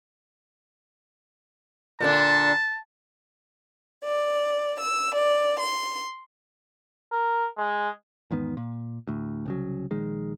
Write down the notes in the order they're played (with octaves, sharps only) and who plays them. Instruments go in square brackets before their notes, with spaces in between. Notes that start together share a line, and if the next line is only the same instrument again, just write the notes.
[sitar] A#2 D3 D4 [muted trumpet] A5
[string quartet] D5
E6
D5
C6
[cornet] A#4
G#3
[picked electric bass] E2 G#2 D#3 B3
A#2
D2 A2
C2 C#3 F#3
A#1 D#3 G#3